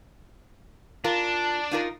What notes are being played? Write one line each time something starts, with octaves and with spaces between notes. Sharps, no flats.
D4 F4 A#4
D#4 F4 A#4